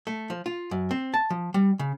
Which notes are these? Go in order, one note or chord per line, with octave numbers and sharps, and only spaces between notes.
A3
F3
F4
F#2
C4
A5
F3
G3
C#3